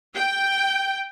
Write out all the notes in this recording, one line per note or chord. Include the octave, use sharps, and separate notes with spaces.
G5